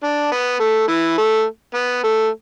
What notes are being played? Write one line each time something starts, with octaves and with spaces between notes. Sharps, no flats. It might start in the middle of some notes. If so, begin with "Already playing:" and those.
D4
B3
A3
E3
A3
B3
A3